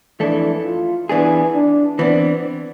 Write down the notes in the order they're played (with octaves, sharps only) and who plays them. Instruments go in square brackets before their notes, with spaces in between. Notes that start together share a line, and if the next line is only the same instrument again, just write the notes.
[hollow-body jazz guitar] F2 E3 A3 D4 A4 [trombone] E4
[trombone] F4
[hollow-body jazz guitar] E3 B3 D4 G#4 [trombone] E4
[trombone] D4
[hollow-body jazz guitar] E3 B3 D4 [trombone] C4